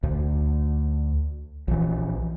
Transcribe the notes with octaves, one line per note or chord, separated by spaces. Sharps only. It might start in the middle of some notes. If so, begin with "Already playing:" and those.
D2
A#1 E3